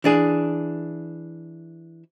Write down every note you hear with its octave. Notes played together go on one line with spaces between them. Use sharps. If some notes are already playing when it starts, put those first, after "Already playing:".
E3 D4 G#4